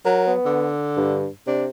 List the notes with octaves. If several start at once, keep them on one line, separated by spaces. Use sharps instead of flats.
F#3 A#4
B3
D3
G2
C3 D4